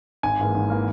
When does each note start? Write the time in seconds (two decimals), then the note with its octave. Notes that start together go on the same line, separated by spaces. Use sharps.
0.23 G#1 G#5
0.39 G#2 E3 A#3
0.54 G#1
0.70 E3 A#3